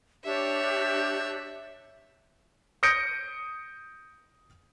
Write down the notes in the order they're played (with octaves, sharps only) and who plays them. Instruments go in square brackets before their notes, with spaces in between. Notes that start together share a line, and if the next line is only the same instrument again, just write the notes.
[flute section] D4 G4 [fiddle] C#5 E5
[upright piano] D#6 G6 A#6 C#7 D7